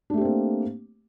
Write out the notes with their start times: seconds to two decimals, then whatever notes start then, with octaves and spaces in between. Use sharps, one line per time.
0.10 D4
0.14 A3
0.17 G4
0.21 C4
0.25 A#3